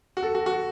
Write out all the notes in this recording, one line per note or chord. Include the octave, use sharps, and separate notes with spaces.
F#4
A4
F#4
F#4